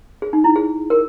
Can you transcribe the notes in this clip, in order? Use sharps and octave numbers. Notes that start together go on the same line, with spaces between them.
G#4
D#4
E4
G#4
A#4